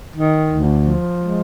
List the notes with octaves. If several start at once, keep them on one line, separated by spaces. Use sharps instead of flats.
D#3
D2
F3
G#3